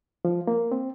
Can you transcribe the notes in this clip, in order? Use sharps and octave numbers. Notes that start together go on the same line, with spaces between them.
F3
A#3
C4